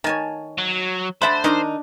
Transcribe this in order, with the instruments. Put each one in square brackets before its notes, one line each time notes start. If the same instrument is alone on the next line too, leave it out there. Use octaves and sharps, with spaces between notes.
[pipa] D#3 [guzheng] C#5 G#5 A5
[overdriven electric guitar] F#3
[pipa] D3 E5 B5 [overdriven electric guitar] C5 [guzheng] F#5 A5
[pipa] D#3 D#4 [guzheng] D4 D#5 A#5